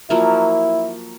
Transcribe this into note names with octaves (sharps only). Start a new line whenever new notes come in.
F3 F#3 A#3 E4